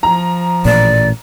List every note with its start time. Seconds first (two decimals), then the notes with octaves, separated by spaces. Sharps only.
0.03 F3 A#5
0.65 A1 A#2 A#3 D5